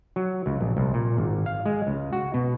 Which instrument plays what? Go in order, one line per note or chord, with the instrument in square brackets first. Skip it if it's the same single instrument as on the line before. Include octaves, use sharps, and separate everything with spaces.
[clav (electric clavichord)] F#3
C#2
A#1
C2
A#2
G#1
F5
G#3
C#2
F#4
B2